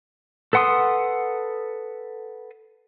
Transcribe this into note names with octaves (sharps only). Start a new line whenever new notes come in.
A4 B4 F#5 C6 D#6